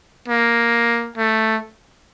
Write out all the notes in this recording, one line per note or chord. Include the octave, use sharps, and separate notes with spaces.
A#3
A3